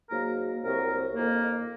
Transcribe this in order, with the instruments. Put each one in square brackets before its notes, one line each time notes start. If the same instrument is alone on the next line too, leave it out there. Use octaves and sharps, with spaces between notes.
[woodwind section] G#2 F#3 A#3 A#4
C2 C3 F#3 A#4
F2 D#3 A#3